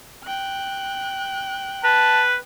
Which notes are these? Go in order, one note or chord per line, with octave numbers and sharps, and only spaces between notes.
G5 F#6
B4 A5